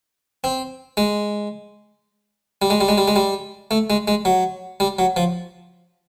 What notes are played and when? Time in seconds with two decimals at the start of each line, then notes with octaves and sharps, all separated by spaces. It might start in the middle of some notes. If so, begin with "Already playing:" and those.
0.44 C4
0.97 G#3
2.62 G3
2.70 G#3
2.81 G3
2.88 G#3
2.98 G3
3.08 G#3
3.16 G3
3.71 A3
3.90 G#3
4.08 G#3
4.25 F#3
4.80 G3
4.99 F#3
5.16 F3